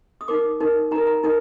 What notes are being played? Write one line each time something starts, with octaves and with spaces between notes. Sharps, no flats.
D#6
D#4 A#4 D6
D#4 A#4
D#4 A#4 A#5
A#5
D#4 A#4